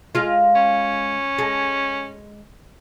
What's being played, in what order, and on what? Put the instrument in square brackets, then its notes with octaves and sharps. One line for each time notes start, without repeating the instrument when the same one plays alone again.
[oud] G#3 F4
[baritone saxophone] C#4
[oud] G#3